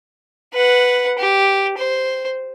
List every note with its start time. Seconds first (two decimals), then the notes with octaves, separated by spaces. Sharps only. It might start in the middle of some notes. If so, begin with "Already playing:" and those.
0.53 B4 F#5
1.19 G4
1.78 C5